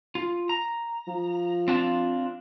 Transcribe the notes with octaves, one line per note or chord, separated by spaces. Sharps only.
F4
A#5
F3
C4 D4 F4